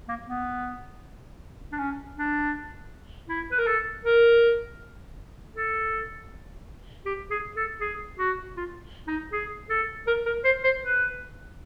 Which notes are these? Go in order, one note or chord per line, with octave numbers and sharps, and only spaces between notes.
A#3
B3
D4
C#4
D4
E4
B4
A#4
A4
A#4
A4
G4
G#4
A4
G#4
F#4
F4
D#4
G#4
A4
A#4
A#4
C5
C5
B4